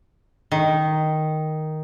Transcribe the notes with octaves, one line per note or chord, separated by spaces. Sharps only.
D#3